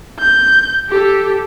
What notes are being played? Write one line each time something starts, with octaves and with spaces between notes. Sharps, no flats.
G6
G4 A4